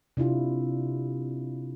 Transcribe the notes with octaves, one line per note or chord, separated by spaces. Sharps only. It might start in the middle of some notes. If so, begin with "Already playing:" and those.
C3 D4 E4 F4